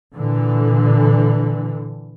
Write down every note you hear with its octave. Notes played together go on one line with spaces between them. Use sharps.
A#2 D3 E3